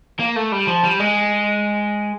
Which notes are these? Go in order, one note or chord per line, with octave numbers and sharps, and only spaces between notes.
A#3
A3
G3
F3
G3
G#3